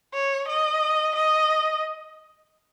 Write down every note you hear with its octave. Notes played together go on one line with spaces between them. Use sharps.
C#5
D#5
D#5